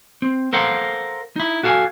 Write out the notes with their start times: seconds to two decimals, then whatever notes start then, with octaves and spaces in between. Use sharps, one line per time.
0.22 C4
0.53 A4 A#4 C5 F5 F#5
1.36 D#4 E4
1.63 F#4 A4 F5 F#5 G#5